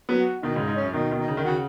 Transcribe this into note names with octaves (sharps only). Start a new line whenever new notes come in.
F#3 B3
F#4
B2 D#3 D#4
G#2 C#3
D#4
G#2
C#4
F#2
B2 D#3 D#4
B2 D#3
D#4
C#3
D#3
C#3 F#4